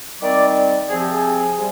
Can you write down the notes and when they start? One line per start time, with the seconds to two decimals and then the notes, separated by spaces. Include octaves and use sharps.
0.21 D#3 G3 C4 D5
0.56 D5
0.89 C3 F3 C4 G#4
1.00 G4
1.11 G#4
1.56 C3 G3